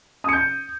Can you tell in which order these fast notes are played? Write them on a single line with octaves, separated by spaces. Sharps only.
D#6 C#7 G6